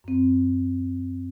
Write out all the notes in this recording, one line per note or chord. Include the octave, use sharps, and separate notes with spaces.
F#2 C4